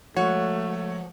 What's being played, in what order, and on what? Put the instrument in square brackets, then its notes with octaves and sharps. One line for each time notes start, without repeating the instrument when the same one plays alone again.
[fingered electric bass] F3 G#3 [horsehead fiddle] A3 [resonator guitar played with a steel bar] F#4 [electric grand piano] C#5